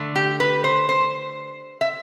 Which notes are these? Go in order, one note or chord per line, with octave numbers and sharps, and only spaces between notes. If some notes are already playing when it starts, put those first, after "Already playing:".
Already playing: D3 A3
G4
B4
C5
C5
E5